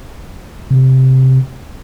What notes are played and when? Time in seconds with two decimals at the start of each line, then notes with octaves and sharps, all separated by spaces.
0.70 C3